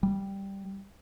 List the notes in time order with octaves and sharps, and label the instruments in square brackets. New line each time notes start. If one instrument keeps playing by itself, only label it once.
[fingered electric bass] G3